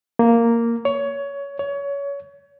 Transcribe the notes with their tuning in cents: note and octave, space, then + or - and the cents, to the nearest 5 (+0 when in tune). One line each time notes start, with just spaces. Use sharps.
A#3 -5
C#5 +20
C#5 +25